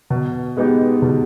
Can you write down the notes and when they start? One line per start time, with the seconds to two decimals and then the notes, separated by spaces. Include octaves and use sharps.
0.10 B2
0.57 G#3 B3 D#4 G4
1.02 B2